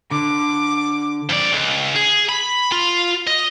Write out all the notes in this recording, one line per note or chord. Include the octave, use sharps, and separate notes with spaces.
D3 D6
F2 D5
C#2
G#4
B5
F4
D#5